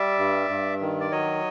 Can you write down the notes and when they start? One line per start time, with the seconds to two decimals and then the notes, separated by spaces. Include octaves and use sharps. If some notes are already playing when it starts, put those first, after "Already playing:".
Already playing: G3 D5 E5
0.19 G2
0.49 G2
0.81 D#3
1.00 D5
1.11 F#3 C#5 D#5